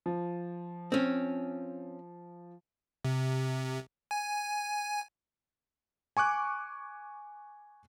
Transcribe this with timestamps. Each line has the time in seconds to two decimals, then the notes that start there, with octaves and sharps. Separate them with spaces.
0.06 F3
0.92 C4 C#4
3.05 C3
4.11 G#5
6.17 G#5 C#6 D6 F#6